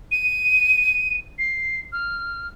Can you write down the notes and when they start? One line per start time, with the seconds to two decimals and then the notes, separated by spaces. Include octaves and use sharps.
0.12 D#7
1.39 C7
1.92 F6